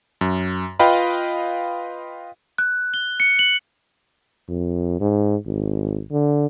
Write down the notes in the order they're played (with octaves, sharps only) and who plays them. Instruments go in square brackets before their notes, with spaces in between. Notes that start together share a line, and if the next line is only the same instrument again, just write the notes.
[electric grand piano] F#2
F4 B4 D#5 F5 G5 B5
[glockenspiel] F#6
G7
C#7
F#7
[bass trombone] F2
G#2
G#1
D3